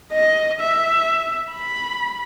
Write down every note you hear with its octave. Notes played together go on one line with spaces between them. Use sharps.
D#5
E5
B5